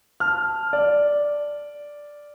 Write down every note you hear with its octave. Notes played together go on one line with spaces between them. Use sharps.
A5 F6
D5